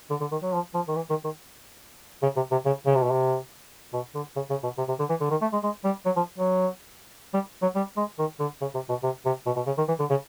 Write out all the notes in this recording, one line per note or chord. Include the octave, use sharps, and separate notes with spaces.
D3
D3
D#3
F#3
F3
F3
D#3
E3
D#3
D#3
C#3
C3
C3
C#3
C#3
C3
B2
C3
B2
D3
C#3
C#3
B2
C3
C3
D3
E3
D3
D#3
A3
G#3
G#3
G3
F#3
F3
F#3
G3
F#3
G3
G#3
D#3
D3
C#3
C3
B2
C3
C3
B2
B2
C#3
D#3
E3
D3
C#3